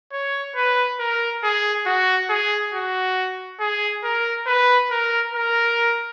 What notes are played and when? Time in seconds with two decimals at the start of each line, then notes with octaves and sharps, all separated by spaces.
0.13 C#5
0.56 B4
1.00 A#4
1.43 G#4
1.86 F#4
2.30 G#4
2.73 F#4
3.60 G#4
4.04 A#4
4.47 B4
4.91 A#4
5.34 A#4